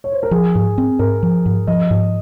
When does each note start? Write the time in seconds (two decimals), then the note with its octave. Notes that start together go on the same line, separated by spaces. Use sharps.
0.04 C#5
0.12 C5
0.23 A#4
0.31 F3 G#4
0.55 G#2
0.78 C4
0.99 G#2 A#4
1.23 F3
1.46 G#2
1.67 F3 D#5
1.90 G#2